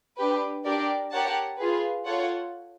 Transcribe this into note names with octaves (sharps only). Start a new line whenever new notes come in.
D4 G4 B4
D4 G4 A#4 D5
G4 A#4 C#5 F#5 A5
F4 G#4 B4
F4 A4 C#5 F#5